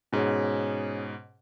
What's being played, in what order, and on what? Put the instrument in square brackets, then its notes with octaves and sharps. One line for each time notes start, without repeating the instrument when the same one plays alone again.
[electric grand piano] G#2 B2 [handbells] C#4 G#4 C#5